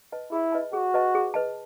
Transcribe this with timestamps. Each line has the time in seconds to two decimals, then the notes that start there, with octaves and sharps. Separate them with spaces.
0.12 B4 D#5 A5
0.32 E4 G#4
0.52 B4 D#5 A5
0.73 F#4 G#4
0.94 B4 D#5 A5
1.15 G#4
1.34 B4 D#5 A5